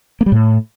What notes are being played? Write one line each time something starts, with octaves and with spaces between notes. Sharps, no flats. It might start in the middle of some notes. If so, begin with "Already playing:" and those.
A#3
G3
A2